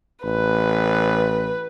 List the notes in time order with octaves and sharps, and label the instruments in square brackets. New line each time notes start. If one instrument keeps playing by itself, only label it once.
[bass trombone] A1 [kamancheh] B4